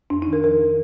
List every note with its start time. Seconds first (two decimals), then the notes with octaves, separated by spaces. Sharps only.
0.10 F2 D4
0.22 D#4
0.28 D#3
0.33 A#4
0.44 F3 A#4
0.61 F3